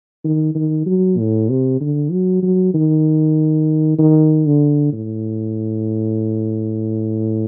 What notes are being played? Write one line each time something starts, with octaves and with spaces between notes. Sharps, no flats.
D#3
D#3
F#3
A2
C3
D3
F#3
F#3
D#3
D#3
D3
A2